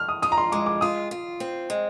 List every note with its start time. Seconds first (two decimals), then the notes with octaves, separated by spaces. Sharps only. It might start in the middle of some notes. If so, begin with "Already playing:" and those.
Already playing: F6
0.09 D#6
0.22 F4 D#6
0.32 A#5
0.38 C6
0.52 G#3 D6
0.66 D6
0.81 F4 D#6
1.11 F4
1.40 C4
1.70 G#3